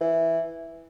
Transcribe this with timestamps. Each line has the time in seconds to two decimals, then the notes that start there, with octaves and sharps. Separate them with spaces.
0.01 E3